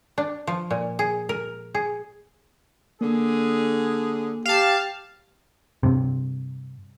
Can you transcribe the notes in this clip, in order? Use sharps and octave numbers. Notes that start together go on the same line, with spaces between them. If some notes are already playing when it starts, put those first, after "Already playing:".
D4
F3
A#2
G#4
A#4
G#4
D3 A#3 G#4
G4 F5 A5
G2 C3